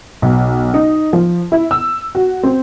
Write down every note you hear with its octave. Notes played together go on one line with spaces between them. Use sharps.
B1
D#4
F3
E4
E6
F#4
C4